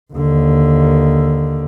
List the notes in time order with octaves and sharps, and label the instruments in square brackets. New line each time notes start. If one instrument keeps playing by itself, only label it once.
[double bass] D#2 D3